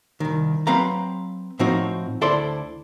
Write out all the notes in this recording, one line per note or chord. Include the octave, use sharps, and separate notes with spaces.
C2 D#3
F#3 C4 B4 F5 A#5
A2 F3 C4 D#4 F#4
D2 E4 A4 C5 D5 C6